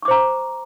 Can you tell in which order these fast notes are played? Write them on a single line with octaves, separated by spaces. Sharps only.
C#6 D6 C5 A#5